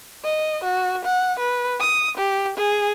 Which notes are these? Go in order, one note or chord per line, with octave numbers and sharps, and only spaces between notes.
D#5
F#4
F#5
B4
D#6
G4
G#4